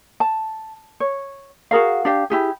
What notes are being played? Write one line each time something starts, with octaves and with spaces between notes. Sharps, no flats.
A5
C#5
F#4 G#4 A#4 F5
D4 G4 F5
E4 G4 G#4